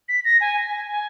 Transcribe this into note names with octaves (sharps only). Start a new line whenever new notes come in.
B6
A#6
G#5
G#5
G#5